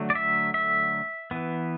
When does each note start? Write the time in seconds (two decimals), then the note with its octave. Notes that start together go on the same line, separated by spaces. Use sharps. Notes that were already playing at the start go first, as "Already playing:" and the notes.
Already playing: D3 F#3 A3
0.10 D5
0.15 E5
0.54 E5
1.31 E3 B3